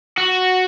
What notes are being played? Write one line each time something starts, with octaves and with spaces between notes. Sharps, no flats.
F#4